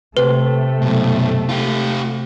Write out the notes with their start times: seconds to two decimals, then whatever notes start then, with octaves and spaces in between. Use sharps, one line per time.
0.17 C3 A3 B4
0.82 F#2 B2
1.49 F4 G4